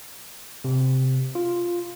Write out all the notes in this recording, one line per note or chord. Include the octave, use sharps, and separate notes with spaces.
C3
F4